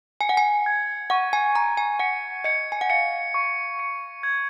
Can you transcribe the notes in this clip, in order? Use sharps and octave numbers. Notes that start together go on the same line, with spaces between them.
G#5 C#7
F#5
G#5
G#6
F#5 C#6
G#5
A#5 C#6
G#5
F#5 C#7
D#5 C#7
G#5
F#5
F5 C#7
C#6
C#7
G#6